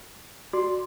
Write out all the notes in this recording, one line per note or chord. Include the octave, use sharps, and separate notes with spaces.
F#4 D5 C6